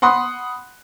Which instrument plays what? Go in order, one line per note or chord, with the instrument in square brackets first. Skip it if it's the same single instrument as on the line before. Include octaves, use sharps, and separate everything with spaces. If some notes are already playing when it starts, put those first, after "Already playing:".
[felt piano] F#5 B5 C6 D#6 F#6